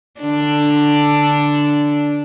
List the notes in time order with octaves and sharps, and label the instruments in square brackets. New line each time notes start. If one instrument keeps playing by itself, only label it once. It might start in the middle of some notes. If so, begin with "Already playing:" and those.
[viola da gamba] D3 D4